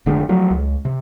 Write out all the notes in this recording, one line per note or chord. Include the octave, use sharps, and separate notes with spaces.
F1 D3 G#3 A3
F3 F#3 A3
C#2
C3